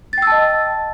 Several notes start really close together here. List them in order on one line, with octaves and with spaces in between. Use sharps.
A6 G5 E6 A5 D#5